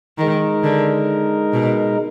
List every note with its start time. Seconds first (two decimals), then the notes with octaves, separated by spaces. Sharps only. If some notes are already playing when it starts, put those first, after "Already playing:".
0.18 D#3 G#3 D#4 A#4
0.63 D3
1.53 B2